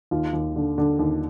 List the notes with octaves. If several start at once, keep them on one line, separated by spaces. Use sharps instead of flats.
D#2 F4
D#2
D3
D3
D#2